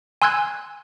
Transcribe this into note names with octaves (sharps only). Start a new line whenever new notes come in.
G#5 C6 E6 F#6 G#6